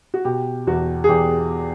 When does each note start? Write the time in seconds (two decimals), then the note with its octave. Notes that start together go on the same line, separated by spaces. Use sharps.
0.14 F#4
0.25 B2 G4
0.67 E2 F#4
1.04 G#4
1.09 E2 G4